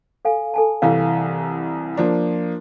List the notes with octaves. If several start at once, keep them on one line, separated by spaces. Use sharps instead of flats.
A4 F5 G#5
A4 G#5 A5
C2 E3 F5
F3 A#3 D4